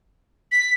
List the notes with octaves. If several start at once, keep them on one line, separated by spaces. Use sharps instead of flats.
B6